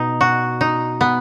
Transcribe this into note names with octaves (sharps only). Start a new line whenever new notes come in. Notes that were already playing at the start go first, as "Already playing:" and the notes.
Already playing: B2 D#4
F#4
D#4
B3